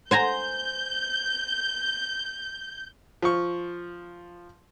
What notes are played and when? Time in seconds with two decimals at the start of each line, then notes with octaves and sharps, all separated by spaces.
0.11 C5 G#5 A#5 G6
3.22 F3 C#6